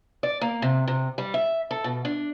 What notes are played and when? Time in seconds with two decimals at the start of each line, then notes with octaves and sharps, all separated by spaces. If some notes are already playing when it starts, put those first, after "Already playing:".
0.23 D5
0.41 A#3
0.62 C3
0.87 C3
1.18 G3
1.34 E5
1.71 A4
1.84 B2
2.05 D4